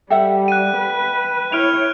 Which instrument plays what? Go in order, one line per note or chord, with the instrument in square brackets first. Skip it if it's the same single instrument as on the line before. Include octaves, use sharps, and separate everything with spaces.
[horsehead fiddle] G3 [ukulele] A4 E5 F#5 [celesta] G5
[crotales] F#6 D#7
[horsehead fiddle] B4
[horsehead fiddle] E4 C#5 [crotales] F6 D7 F7